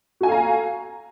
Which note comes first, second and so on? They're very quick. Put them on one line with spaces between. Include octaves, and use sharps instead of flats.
F#4 G#5 A4 F5 A#5